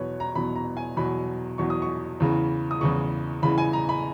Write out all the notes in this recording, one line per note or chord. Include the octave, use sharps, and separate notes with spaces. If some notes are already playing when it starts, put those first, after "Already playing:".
Already playing: E2 B2 F#3 B4 C#5
A#5
E2 B2 F#3 B5
A#5
G#5
E2 B2 F#3 B5
E2 B2 F#3 C#6
D#6
C#6
E2 C#3 E3
D#6
E2 C#3 E3 C#6
E2 C#3 E3 B5
G#5
A#5
B5